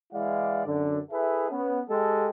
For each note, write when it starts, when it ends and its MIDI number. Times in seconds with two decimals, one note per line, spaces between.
0.13 0.64 52
0.13 0.64 56
0.13 0.64 64
0.13 0.64 74
0.13 0.64 77
0.13 0.64 78
0.66 0.98 42
0.66 0.98 50
1.11 1.49 64
1.11 1.49 68
1.11 1.49 69
1.11 1.49 71
1.11 1.49 76
1.50 1.81 59
1.50 1.81 61
1.89 2.30 56
1.89 2.30 67
1.89 2.30 69